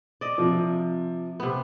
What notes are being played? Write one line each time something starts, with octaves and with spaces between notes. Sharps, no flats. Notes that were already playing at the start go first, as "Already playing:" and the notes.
D5 D#5
C3 F3
C3 B3